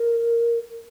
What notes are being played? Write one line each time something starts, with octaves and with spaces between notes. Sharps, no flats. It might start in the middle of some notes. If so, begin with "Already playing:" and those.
Already playing: A#4